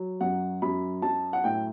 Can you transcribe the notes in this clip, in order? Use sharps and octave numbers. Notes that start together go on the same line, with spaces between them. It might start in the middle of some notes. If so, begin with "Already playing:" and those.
Already playing: F#3
F#2 F#5
F#2 B5
F#3 A5
F#5
A2 G5